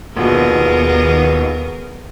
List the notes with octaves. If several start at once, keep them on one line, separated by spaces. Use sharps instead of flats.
A#1 D#2 B2 B3 G#4 A#4